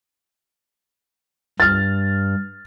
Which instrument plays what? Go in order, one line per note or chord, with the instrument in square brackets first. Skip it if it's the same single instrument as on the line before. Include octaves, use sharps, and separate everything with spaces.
[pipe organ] G2 [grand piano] F6 A6